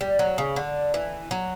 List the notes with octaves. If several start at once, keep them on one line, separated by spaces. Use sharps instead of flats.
G3
F#3
C#3
D3
E3
F#3